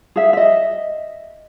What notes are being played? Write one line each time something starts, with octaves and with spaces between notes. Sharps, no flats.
G#4 E5
D#5 E5